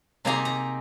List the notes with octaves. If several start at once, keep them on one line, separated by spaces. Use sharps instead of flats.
C3 A#3 D#4 G#4 D#5 A#5
A#5